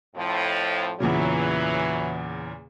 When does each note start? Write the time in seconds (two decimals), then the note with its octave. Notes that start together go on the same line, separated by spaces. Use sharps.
0.16 F2 A2 F3
1.00 E2 A#2 C#3 E3 F#3